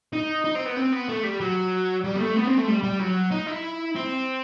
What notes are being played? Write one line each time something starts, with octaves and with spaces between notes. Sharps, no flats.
D#4
D#4
C4
B3
C4
B3
A3
G3
F#3
G3
B3
A3
B3
C4
A3
G3
G3
F#3
D#4
E4
C4